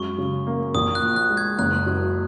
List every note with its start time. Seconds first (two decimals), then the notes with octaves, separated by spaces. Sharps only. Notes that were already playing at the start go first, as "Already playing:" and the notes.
Already playing: F#2 G#3 C#6
0.18 C#3
0.47 A#3
0.75 A#1 D#6
0.95 F#6
1.02 A#2
1.16 F#6
1.30 G#3
1.37 G#6
1.59 F#1 F#6
1.86 F#2